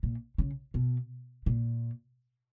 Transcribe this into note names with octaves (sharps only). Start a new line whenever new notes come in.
A#2
C#3
B2
A#2